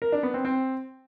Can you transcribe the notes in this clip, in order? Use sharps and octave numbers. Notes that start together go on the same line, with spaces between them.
A#4
D4
B3
C4
C4